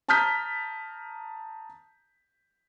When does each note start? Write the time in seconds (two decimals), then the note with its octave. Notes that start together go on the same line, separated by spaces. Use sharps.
0.08 A5 A#5 D#6 F6 G6 B6